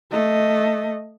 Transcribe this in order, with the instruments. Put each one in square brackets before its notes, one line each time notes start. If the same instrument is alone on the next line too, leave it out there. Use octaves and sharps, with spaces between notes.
[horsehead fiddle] A3 D#5